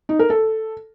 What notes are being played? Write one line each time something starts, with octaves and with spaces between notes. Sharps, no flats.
D#4
A#4
A4